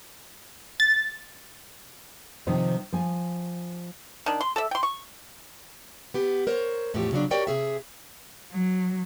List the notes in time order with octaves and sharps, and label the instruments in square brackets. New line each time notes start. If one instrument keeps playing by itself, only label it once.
[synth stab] A6
[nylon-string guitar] C3 D#3 F3 D#5
F3 G#5
[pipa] D#3 D4
C6
A4 D5 E5
G5 C6
C#6
[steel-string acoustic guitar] B3 G4
A#4 C5 C#5
E2 A2 F3 F#4 G4
C#3 F#3 D4
F#4 G4 A#4 C#5 D5 G5
C3 G#4 E5
[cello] F#3